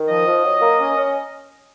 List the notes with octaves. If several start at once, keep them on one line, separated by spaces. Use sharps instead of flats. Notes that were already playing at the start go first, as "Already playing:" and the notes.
Already playing: D#3
F3 D#5
F3
F#3
A#3
C#4
C#4